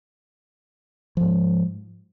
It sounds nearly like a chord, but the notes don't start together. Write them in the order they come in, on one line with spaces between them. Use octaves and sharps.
F3 G#2 G#3